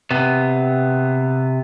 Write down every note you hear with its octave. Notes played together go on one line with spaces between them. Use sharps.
C3 B3